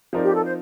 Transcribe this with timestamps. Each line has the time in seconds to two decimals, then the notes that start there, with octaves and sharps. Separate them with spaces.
0.13 F3 C4 D#4 A#4 D5
0.23 G4
0.33 A4
0.44 C5